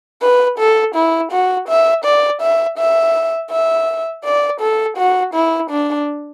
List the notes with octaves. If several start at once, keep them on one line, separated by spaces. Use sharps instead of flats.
B4
A4
E4
F#4
E5
D5
E5
E5
E5
D5
A4
F#4
E4
D4